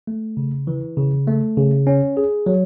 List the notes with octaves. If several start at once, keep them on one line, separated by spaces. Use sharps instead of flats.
A3
C#3
E3
C#3
A3
C#3
C#4
G#4
F#3